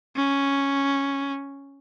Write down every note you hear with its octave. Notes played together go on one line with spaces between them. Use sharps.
C#4